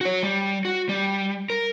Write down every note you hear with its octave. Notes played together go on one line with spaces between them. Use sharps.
F#4 C#5
G3
F#4
G3
A#4